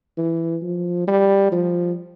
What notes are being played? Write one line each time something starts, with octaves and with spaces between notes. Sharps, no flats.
E3
F3
G3
F3